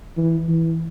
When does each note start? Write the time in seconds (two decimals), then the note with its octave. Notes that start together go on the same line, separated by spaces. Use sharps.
0.17 E3
0.48 E3